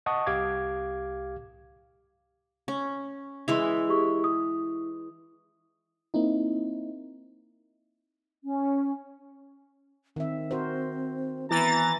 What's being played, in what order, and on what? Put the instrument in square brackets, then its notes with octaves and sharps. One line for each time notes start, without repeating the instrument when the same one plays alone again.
[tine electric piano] D#5 F#5 A5 C#6 D#6
C2 G4 F5 D6 G#6
[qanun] C#4
[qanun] E3 G#3 E4 [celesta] C6 E6 F7
[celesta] G4 G#4 C#6
D#6
[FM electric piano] A#3 C4 D#4 E4
[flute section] C#4
[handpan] D#3 E5 [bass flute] C4
[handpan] F#4 A#4 C5
[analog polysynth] E3 A6 [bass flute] B3 [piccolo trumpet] A#5